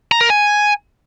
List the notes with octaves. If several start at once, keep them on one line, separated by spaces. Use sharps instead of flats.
A#5
A#4
G#5